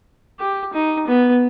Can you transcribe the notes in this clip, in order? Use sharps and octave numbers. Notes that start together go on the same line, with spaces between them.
G4
D#4
B3